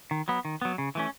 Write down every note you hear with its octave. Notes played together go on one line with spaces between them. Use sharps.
D#3
F#3 B3
D#3
F#3 B3
C#3
E3 A3 C#4